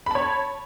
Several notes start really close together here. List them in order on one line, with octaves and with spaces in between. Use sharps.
B5 A5 C#5